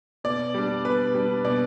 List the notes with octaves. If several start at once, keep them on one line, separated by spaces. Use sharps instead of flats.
B2 D5
G3 D4
B2 B4
G3 D4
B2 D5